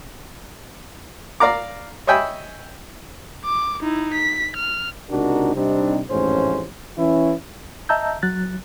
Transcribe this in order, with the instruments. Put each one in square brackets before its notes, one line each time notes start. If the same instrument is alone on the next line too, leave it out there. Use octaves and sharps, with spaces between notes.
[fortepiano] D5 F5 A#5 D6
C#5 D#5 E5 G5 G#5 B5
[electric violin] D6
D#4 E4
B6
F6
[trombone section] C#2 C3 D4 D#4 F#4 A#4
C3 G3 C4 D4 D#4
A1 F2 G#2 A3 C#4 C5
E3 C#4 E4
[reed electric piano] D#5 E5 A5 A#5 E6 G6
F#3 F#6 A6